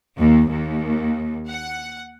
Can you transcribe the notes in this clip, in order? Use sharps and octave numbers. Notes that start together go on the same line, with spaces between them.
D#2
D#2
F#5